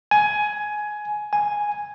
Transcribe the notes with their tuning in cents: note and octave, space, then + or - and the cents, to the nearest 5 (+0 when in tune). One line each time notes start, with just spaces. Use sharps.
G#5 +15
G#5 +0